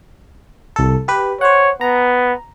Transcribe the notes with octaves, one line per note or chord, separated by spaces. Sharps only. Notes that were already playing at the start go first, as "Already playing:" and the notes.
C2 A4
G4 B4
C5 C#5 F#5
B3 A#5